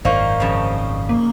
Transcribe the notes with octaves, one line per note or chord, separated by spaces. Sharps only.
G#1 F#2 A#3 D#4 C5 D5 F5 C#6
F2 C#3 A5
A#3